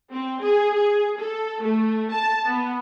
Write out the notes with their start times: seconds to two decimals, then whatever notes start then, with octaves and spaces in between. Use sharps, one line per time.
0.11 C4
0.42 G#4
0.75 G#4
1.19 A4
1.62 A3
2.11 A5
2.47 B3